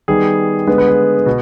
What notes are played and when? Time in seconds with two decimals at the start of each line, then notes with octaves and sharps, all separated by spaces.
0.08 D#3 G3 B3 G#4
0.67 D3 G#3 B3 B4
0.78 B4
0.88 G#4
1.26 B2